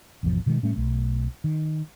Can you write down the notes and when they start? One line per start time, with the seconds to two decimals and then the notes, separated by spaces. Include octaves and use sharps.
0.23 G#1 E2 B2 F3
0.46 B2 D#3 F3 G#3
0.63 A2 G3 A3 C#4
0.76 B1 A3
1.44 D#3